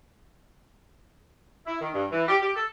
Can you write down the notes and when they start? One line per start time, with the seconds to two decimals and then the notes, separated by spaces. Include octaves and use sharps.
1.66 E4
1.80 D#3
1.94 G2
2.12 E3
2.28 G4
2.42 G4
2.56 A4